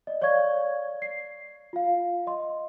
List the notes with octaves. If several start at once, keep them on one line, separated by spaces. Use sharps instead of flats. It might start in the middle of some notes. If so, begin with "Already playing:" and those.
D5 D#5
C#5 D5 F5 C#6 G#6
C7
F4 F5
D#5 C6